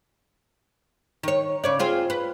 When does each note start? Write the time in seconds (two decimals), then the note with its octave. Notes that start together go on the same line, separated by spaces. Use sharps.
1.23 D#3 C#5
1.64 C#3 C#5 D5
1.79 C4 F4 G#4
2.10 B4